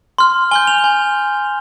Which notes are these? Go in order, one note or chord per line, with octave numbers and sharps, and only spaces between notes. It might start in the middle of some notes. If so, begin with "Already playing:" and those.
C6 F6
G#5 C6 G6 G7
F7
G#5 C6 G6